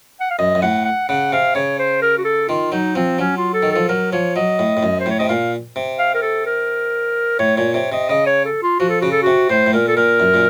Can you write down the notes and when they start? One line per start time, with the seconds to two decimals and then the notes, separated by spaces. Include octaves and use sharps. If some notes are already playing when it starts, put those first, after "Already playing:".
0.21 F#5
0.30 F5
0.39 F#2 D#5
0.55 F#2
0.62 A2 F#5
0.85 F#5
1.09 C#3 F#5
1.32 C3 F5
1.55 C#3 C#5
1.79 C5
2.02 A#4
2.18 F#4
2.25 A4
2.49 D#3 F4
2.72 F#3 D#4
2.95 F3 C4
3.19 F#3 C#4
3.37 F4
3.54 A4
3.62 D#3
3.72 F3 A4
3.89 F#3 A#4
4.13 F3 C#5
4.36 F#3 D#5
4.59 A2
4.77 A2
4.83 F#2
5.00 C5
5.06 A2 C#5
5.19 C3 D#5
5.29 A#2 F5
5.76 C3
5.99 F5
6.15 A#4
6.22 A4
6.46 A#4
7.39 A2 C#5
7.57 A#2 C#5
7.74 C3 C#5
7.92 C3 D#5
8.09 C#3 D#5
8.27 C#5
8.45 A4
8.63 F4
8.80 F3 F#4
8.90 A4
9.01 C#3 F#4
9.12 A4
9.23 C3 F#4
9.50 A2 C5
9.66 A2
9.73 A#2 A#4
9.88 A4
9.97 A#2 A#4
10.20 F#2
10.34 A#2